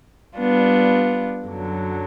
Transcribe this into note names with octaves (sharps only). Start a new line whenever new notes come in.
G3 B3 D4 F4
F#2 D3 F#3